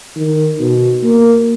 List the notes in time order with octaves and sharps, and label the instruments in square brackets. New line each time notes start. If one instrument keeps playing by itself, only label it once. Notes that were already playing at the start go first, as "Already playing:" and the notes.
[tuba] D#3
B2
A#3